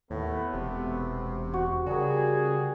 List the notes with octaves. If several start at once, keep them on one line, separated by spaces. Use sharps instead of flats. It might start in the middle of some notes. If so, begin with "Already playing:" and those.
D#2 A2 A3 B3 B4
E1 C3
F#4
C#3 G3 F#4 G#4 A#4